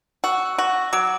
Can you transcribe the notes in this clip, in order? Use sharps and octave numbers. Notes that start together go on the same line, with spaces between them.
F#4 E6
F#4
F#3 D6 D7